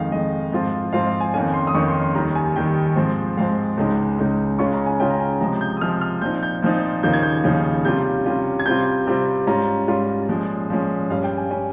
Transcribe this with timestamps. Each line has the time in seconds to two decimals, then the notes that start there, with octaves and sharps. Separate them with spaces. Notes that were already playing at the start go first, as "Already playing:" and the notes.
Already playing: F2 D#3 G#3 F5
0.11 F2 D#3 G#3 D#5
0.52 G#2 F3 C4 F4
0.93 G#2 F3 C4 F4 F5
1.07 F5
1.20 G#5
1.34 F2 D#3 A#3 C#4 G#5
1.54 C6
1.67 D#6
1.75 F2 D#3 A#3 C#4 C#6
1.88 C6
2.02 C6
2.15 D#2 D#3 G3 A#5
2.35 G#5
2.56 D#2 D#3 G3 G5
2.96 G#2 F3 G#3 C4
3.37 G#2 F3 G#3 C4 F5
3.77 C#2 C#3 G#3 D#4
4.18 C#2 C#3 G#3 D#4
4.59 C#3 G#3 C#4 F4 C#6
4.73 A#5
4.86 G#5
5.00 C#3 G#3 C#4 F4 G5
5.10 A#5
5.20 G#5
5.41 C3 F3 G#3 A#5
5.61 G6
5.77 D#6
5.81 C3 F3 G#3 F6
6.01 F6
6.22 A#2 F3 C4 D#4 G6
6.43 G6
6.62 A#2 F3 C4 D#4
7.03 D#2 C#3 F3 A#3 D#4 G6
7.13 G#6
7.23 G6
7.44 D#2 C#3 F3 A#3 D#4
7.84 C3 G3 C#4 F4 G6
8.26 C3 G3 C#4 F4
8.60 G#6
8.66 C3 G3 C4 F4 G6
9.07 C3 G3 C4 F4
9.47 G#2 G3 C#4 F4 A#5
9.88 G#2 G3 C#4 F4
10.28 A#2 F3 G#3 C#4
10.70 A#2 F3 G#3 C#4
11.10 G2 G3 C#4 F5
11.24 G5
11.37 G#5
11.51 G3 C#4 G#5